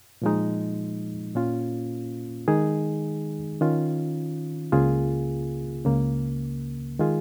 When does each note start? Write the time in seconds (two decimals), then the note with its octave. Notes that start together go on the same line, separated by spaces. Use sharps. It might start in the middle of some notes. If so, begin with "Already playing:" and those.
0.22 A#2 F3 G#3 D#4
1.35 A#2 A#3 C#4 F4
2.48 D#3 G#3 D#4 G#4
3.61 D#3 C#4 F4
4.72 C#2 C#3 A#3 F4 G#4
5.85 C#2 C#3 A#3
6.99 D#3 G#3 F4 G#4